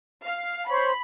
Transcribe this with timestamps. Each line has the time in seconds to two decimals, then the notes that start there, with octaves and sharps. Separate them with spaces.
0.24 F5
0.70 C5 C#5 B5